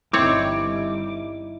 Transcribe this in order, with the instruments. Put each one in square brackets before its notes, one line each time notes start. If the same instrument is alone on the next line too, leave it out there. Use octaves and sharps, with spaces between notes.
[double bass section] G1 G3 [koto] C4 C#5 [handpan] D#4 E4 [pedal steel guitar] D6